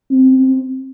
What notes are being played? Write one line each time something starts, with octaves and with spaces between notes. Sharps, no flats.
C4